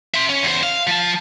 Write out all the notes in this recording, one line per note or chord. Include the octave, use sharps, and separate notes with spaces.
E5 C6
C#4
E2 C5
F5
F3 A5